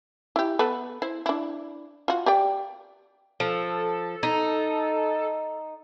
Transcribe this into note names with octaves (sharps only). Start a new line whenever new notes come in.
E4 G4
B3 A4 B4
E4 C5
D4 E4
F4 F#4
G4 D5 G5
F3 A4
D#4